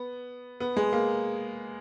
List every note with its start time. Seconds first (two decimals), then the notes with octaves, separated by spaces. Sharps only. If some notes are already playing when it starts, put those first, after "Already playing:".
Already playing: B3
0.60 B3
0.77 G#3
0.93 A#3